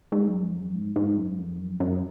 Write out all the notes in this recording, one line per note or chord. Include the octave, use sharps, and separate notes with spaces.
G#2
F#2
F2
F#2
G#2
G#2
F#2
F2
F#2
F#2